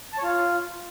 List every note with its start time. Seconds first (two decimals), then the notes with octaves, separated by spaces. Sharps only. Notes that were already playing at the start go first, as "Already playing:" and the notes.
0.13 A5
0.18 C#5
0.23 F4